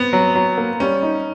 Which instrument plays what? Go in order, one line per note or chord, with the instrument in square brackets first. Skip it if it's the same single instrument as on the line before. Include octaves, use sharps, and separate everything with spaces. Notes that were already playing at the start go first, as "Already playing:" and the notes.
Already playing: [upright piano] B3 C4
[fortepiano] F#3
F#3
A#3
[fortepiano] G3 [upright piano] C#4
[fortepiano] D#4